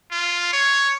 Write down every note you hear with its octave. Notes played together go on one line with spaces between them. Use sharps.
F4
C#5